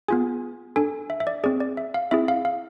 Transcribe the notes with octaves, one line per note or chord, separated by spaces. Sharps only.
B3 F4 G#4 G#5
D4 A4 G#5
E5
E5
D5
C4 G#4 D5
D5
E5
F5
C4 E4 G#4 E5
F5
F5